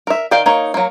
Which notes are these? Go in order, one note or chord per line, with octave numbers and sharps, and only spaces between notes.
A#4 E5
D#3 D5 F5 G5
A#3 D#4 C#5
F#3 A#3